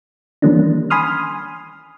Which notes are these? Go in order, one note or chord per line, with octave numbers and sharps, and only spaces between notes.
D#3 E3 G3 A#3 C#4 D4
G#5 B5 C6 D#6 F6